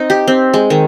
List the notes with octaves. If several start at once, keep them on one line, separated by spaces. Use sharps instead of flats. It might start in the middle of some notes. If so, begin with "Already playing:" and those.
Already playing: C4 D#4
G4
C4
G#3
D#3